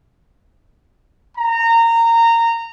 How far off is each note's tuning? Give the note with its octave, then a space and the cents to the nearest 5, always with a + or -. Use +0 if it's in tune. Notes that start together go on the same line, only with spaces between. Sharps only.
A#5 -20